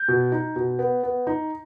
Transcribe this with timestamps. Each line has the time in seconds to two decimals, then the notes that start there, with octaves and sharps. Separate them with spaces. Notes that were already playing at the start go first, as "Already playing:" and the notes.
Already playing: G6
0.08 B2
0.32 D#4
0.56 B2
0.79 B3
1.03 B3
1.27 D#4